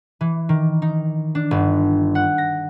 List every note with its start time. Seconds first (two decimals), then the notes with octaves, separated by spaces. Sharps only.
0.21 E3
0.49 D#3
0.82 D#4
1.35 D4
1.51 G1
2.15 F#5
2.38 A#6